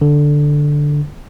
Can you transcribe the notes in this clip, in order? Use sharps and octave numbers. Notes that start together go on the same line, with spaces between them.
D3